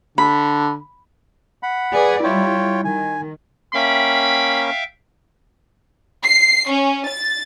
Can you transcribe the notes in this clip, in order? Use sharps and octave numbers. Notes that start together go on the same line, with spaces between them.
D3 B5
F#5 B5
G#4 B4 D5
G3 E4 F4 C#5 G5
D#3 G#5
A#3 C#4 E5 F5 G5 B5
C7
C#4
A6